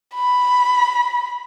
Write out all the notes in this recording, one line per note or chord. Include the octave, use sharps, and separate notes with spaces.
B5